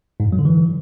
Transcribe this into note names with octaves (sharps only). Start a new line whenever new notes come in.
G#2
F#2
F#3
D3
E3